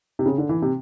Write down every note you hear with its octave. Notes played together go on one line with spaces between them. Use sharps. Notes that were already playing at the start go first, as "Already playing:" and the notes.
C3
C#3
D3
E3
C3